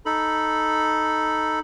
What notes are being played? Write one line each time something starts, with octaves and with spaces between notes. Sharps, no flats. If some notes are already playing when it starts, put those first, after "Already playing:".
D#4 A4 B5